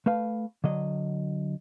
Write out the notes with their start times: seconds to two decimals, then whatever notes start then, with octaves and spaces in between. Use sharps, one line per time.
0.06 A3 B4 F5
0.64 D3 F#3 D#5